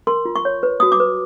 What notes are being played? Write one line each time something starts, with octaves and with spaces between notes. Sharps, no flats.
A#4 C6
F4
C#6
C#5
B4
F#4 D#6
D6
B4